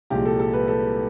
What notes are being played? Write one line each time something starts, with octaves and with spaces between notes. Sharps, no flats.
C2 A#2 F3 G#3 G4
A4
A4
B4
A4